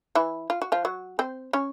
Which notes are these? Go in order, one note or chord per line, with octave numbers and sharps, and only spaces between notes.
E3 E4
F4
F#4
F3 F4
F#3 F#4
C4 C5
C#4 C#5